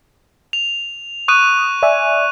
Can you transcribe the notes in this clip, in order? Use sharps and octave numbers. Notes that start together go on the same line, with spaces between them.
F7
C#6 D#6 F#6 D#7
D5 E5 G#5